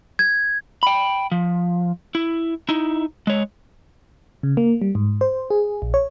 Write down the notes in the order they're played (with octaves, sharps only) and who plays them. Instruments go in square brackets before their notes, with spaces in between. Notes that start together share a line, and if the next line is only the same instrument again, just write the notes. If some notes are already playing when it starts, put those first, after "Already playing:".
[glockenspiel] G#6
[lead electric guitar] G5 B5
F3
E4
D#4 E4
G#3 C#5
[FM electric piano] C#3
A#3
G3
G#2
C5
G#4
A#1
C#5